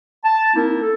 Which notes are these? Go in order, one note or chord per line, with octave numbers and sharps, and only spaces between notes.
A5
A#3 C4 D#4 E4 A#4
A4